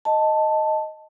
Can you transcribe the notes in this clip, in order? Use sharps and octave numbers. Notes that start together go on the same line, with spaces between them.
D#5 A5